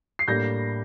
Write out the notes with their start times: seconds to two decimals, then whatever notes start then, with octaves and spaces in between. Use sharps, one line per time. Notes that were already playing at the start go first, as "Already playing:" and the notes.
0.19 C7
0.28 A2 G3 A#3 D4 G6 A#6